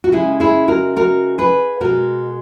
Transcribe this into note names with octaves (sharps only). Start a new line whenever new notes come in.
F#4
C#3 G#3 E4 G#4
E4 G#4
F#4 A#4
F#4 A#4
G#4 B4
B2 G#3 F#4 A#4